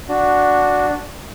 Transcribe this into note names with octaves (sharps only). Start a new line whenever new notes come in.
D4 F#4